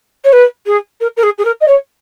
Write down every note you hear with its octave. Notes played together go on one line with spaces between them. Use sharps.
C#5
B4
G#4
A#4
A#4
G#4
G#4
A#4
D#5
C#5